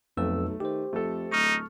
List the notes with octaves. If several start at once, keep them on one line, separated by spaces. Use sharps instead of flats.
B1 F2 A3 B4 E6
D#3 G4 C5
F2 A3 A4
D1 D#4 C#6 F6